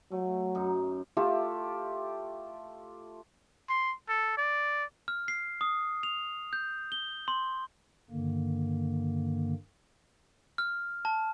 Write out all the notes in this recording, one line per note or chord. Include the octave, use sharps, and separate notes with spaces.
F#3 A3
F#2 D#4
A3 F4 G4 A4
C6
A4
D5
F6
C7
D#6
F7
G6
G7
C6
G2 D3 D#3 A#3
F6
A5